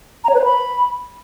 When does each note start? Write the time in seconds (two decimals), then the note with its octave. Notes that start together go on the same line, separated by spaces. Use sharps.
0.24 A#5
0.29 C#5
0.34 B4
0.39 C5
0.44 B5